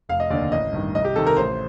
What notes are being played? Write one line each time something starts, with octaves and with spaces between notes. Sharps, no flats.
F1 F5
D#5
D#2 D3 D5
A1 D#5
G2 D#3
C2 D#5
G4
C3 D#3 A4
A#4
A1 C5